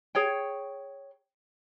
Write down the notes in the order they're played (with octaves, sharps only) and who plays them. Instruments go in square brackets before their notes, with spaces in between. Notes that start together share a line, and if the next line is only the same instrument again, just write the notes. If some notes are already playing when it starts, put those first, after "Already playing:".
[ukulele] G#4 C#5 G5